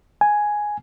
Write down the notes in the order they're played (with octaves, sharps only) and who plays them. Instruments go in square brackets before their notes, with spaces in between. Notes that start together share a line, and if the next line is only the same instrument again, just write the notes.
[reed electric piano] G#5